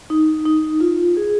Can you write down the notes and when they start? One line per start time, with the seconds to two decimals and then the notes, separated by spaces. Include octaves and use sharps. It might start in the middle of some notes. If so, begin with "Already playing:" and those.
0.10 D#4
0.46 D#4
0.80 F4
1.17 G#4